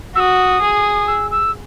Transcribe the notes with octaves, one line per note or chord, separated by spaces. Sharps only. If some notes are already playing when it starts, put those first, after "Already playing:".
F#4 D#6 E6
G#4
E6
E6